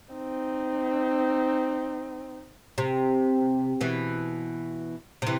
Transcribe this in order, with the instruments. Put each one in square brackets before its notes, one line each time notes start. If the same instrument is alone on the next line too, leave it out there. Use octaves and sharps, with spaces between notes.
[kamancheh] C4 D#4
[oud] C3
B2 E3
C3 E3